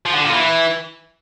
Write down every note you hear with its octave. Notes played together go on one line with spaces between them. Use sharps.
F3
D3
A#2
E3